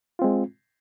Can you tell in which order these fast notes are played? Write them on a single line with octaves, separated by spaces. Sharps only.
F4 C4 G#3